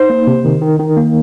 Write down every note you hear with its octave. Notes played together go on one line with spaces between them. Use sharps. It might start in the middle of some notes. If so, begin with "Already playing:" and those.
Already playing: D#4 C5
A#3
C3
D#3
D#3
D#3
A#3